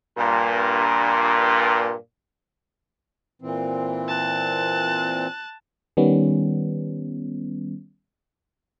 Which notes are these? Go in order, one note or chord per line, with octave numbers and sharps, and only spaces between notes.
G2 A#2
A#2 E3 C4
A5 F#6
D#3 G3 B3 C#4